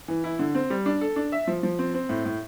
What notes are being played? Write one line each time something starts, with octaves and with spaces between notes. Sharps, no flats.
E3
E4
D3
C4
G3
D4
A4
D4
E5
F3
F3
C4
C4
A2
A2